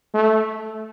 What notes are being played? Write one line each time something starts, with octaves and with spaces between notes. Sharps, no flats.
A3